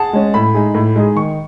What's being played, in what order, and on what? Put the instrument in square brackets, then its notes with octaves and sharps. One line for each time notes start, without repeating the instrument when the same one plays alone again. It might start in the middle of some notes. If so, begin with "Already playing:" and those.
Already playing: [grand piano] G#4 F#5 A5
[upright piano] G#3 C#4
[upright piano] A2 [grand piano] B5
[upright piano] G#3 D#4 G#4
A2
G#3 D#4 G#4
[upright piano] D#3 [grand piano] C#6